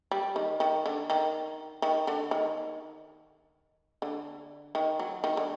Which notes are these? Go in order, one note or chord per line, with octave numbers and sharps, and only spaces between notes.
G3
D#3
D#3
D3
D#3
D#3
D3
D#3
D3
D#3
F#3
D#3
D3